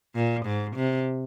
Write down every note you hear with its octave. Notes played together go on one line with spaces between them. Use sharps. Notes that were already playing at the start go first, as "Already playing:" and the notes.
A#2
G#2
C3